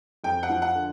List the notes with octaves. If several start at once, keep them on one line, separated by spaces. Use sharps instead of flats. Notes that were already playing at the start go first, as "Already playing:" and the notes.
F2 G5
F#5
F3
F#5
D3